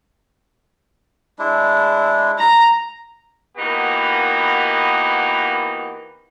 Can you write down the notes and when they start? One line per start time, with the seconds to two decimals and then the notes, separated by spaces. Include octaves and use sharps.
1.39 G#3 D4 E4
2.39 A#5
3.57 E3 A#3 B3 D#4 F#4 G4